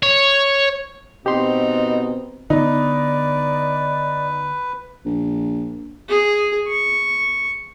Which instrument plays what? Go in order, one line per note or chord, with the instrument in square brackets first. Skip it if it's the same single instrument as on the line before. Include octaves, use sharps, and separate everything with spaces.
[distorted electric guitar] C#5
[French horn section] B2 C4 [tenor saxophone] D#4 [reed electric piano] G4 C6
[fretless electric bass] D3 B3 [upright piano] D#4 [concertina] B4 [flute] D5
[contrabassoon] A#1
[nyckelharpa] G#4
C#6